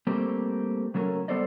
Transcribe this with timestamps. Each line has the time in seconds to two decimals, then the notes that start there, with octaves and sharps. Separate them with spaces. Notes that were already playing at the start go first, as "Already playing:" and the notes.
0.07 G3 A3 A#3 C4 G4
0.94 C#3 F#3 A3 C#4 A#4
1.28 G3 B3 A4 C5 D5 D#5